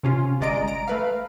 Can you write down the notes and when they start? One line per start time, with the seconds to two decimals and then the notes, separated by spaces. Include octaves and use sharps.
0.03 C3 C#4 F4
0.41 G1 G#3 D5 D#5 A#5 D7
0.68 A#5 D7
0.88 A3 B4 F5